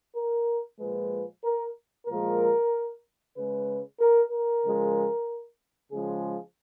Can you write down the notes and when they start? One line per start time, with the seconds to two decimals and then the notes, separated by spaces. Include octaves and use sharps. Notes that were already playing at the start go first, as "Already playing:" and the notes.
0.16 A#4
0.80 A#2 F3 G#3 B4
1.44 A#4
2.08 A#2 F3 G#3 A#4
3.36 C#3 G#3 B4
4.00 A#4
4.32 A#4
4.64 C#3 F3 G#3
5.92 C#3 F3 G#3 G#4